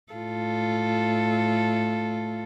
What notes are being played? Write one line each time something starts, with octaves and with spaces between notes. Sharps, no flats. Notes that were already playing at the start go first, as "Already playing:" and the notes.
A2 F4 A4